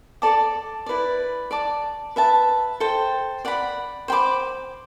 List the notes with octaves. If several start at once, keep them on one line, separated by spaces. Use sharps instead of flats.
A4 D5 A5 D6
E4 B4 D5
D5 A5 D6
B4 E5 A5
A4 C5 G5
D5 F#5 B5
C5 G5 B5 D6